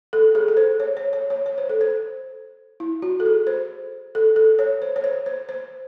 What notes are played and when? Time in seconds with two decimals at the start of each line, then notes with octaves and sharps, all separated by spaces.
0.13 A4
0.35 G#4
0.48 A4
0.57 C5
0.80 C#5
0.97 C#5
1.13 C#5
1.30 C#5
1.46 C#5
1.58 C5
1.69 A4
1.81 C5
2.80 E4
3.02 F#4
3.20 A4
3.25 G#4
3.47 C5
4.15 A4
4.36 A4
4.59 C#5
4.82 C5
4.96 C#5
5.04 C5
5.26 C5
5.49 C5